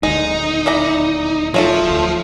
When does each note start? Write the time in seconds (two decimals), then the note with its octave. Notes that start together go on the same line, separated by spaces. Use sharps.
0.03 D#1 D2 G#3 D#4
0.66 E4 D5 A#5
1.54 F3 F#3 A3 A4
1.90 D2